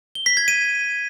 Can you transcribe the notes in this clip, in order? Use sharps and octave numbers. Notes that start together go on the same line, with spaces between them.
G7
B6
G#6
D#7